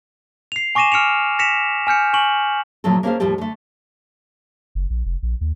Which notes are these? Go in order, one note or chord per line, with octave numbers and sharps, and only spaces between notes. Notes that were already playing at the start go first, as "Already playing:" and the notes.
C7 F7
G#5 C#6 D6 A#6 D#7 E7
F6 C#7 D7 F7
A#6 B6 C#7 E7 F7
G#5 F6 G6 C#7
G#5 C#6 F#7
A#2 D3 F3 F#3 A3 A4
A#3 C#4 D4 G#4 C5 F5
D#2 A2 F3 G3 G4 A4
D3 A3
F#1
A#1
F1
A#1
D#2